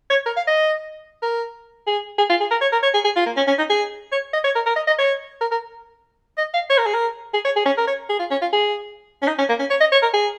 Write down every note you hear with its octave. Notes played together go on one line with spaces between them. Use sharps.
C#5
A#4
F5
D#5
A#4
G#4
G#4
F4
G#4
A#4
C#5
A#4
C#5
G#4
G#4
F4
A#3
C#4
C#4
D#4
G#4
C#5
D#5
C#5
A#4
A#4
D#5
D#5
C#5
A#4
A#4
D#5
F5
C#5
A#4
G#4
A#4
G#4
C#5
G#4
C#4
A#4
C#5
G#4
F4
C#4
F4
G#4
C#4
D#4
C#4
A#3
C#4
C#5
D#5
C#5
A#4
G#4